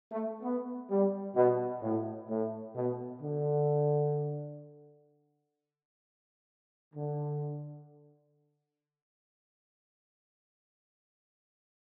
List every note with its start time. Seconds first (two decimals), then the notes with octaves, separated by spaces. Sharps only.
0.12 A3
0.43 B3
0.90 G3
1.36 B2
1.82 A2
2.29 A2
2.76 B2
3.22 D3
6.94 D3